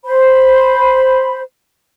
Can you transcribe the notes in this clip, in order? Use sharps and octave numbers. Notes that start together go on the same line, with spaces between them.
C5 B5